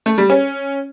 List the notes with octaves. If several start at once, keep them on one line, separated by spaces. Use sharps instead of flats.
A3
G3
C#4